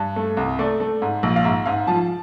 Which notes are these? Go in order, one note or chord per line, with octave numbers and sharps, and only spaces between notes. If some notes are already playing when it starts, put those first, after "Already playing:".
Already playing: G2
A3
C2
A3 D5
A3
G#2
A#1
F5
G#2 E5
G#2 F5
F3 A5